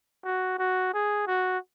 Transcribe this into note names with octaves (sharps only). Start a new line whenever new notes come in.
F#4
F#4
G#4
F#4